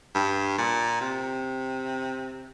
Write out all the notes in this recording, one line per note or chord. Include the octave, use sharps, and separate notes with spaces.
G2
A#2
C3